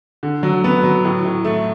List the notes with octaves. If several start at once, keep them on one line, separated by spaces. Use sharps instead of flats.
D3
F#3
B3
F#3
A2
A2
A3